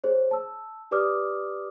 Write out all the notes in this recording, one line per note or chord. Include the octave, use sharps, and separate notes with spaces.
G#4 C5 C#5
A5 E6
G4 B4 D5 D6 D#6 F6